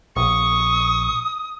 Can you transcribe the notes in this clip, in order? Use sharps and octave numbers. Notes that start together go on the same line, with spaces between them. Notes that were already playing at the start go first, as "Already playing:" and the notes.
A#1 C#6 D#6